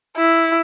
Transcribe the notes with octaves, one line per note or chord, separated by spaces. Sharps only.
E4